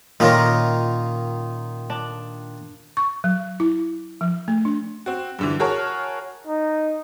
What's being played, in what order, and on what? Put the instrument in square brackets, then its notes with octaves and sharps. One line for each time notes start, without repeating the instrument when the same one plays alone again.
[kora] A#2 C#4 A#4 [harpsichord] D#3 D#4 F4
[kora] D4
[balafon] C#6
F#3
E4
F3
A3
D4
[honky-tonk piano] C4 F#4
G2 D3 E3
F#4 G#4 A#4 C#5 A5 F6
[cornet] D#4